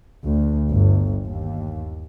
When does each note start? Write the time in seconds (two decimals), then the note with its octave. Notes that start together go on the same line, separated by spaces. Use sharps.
0.25 D2
0.70 G1
1.25 D#2